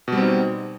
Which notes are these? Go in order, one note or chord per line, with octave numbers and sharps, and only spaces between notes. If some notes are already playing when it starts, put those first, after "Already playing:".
B2 G3 C4 D#4